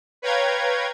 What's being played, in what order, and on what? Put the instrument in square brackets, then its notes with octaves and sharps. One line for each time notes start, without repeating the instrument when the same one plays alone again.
[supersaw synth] B4 C#5 F5 G5 A#5 G#6